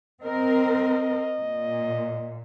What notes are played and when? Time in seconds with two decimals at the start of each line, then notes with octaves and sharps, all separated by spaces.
0.23 C4 A#4 D#5
1.40 A#2